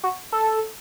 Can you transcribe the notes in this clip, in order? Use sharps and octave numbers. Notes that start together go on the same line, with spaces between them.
F#4
A4